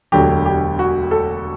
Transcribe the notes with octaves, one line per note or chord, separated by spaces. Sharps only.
E1 D2 D3 F#3 G4
G4
F#4
A4